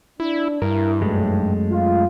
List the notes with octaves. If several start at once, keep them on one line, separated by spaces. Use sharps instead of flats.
D4 E4
G2 E4 A#4
B1 F#2 G#3 A3
F4